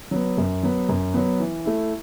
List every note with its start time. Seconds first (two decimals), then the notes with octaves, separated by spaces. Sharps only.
0.11 F#3 B3
0.38 F#2
0.63 F#3 B3
0.89 F#2
1.14 F#3 B3
1.39 E3
1.65 A3 E4